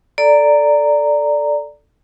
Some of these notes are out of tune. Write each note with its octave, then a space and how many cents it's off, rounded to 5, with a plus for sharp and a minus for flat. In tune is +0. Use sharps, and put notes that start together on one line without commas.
A4 +0 D5 +0 A#5 -10